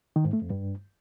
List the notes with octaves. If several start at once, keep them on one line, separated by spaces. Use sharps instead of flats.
D#3
G#2
A3
F2
G2